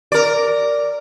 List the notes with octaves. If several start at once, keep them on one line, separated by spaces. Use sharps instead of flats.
A#4 D5